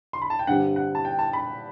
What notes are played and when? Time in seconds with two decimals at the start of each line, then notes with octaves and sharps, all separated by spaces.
0.13 C6
0.22 B5
0.30 A5
0.39 G5
0.47 G2 D3 G3 C4 F#5
0.76 F#5
0.95 A5
1.05 G5
1.19 A5
1.33 B5